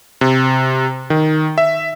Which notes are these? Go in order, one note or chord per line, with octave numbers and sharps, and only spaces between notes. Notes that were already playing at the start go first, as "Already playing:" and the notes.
C3
D#3
E5